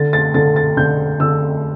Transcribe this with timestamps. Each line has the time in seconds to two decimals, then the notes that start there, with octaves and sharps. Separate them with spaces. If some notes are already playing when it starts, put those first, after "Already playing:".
Already playing: D3 A6
0.13 A6
0.34 D3 A6
0.56 A6
0.77 D3 G6
1.20 D3 E6